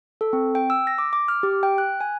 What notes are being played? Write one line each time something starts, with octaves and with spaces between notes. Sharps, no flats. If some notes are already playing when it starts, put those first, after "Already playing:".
A4
C4
G5
E6
A#6
D6
D6
F6
G4
G5
F#6
G#5